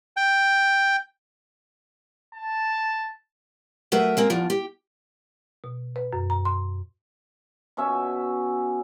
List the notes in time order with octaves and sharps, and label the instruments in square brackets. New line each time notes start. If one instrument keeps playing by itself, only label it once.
[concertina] G5
[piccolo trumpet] A5
[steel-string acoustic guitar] F#3 A3 A#4 B4 E5
G#3 A#3 C4
E2 F3 D4
G4
[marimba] B2
B4
F#2
A#5
C6
[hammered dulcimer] B2 C#4 E5